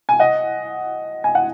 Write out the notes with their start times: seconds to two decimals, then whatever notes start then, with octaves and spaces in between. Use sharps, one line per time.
0.09 G#5
0.19 D#5 F#5
1.24 G#5
1.35 F#5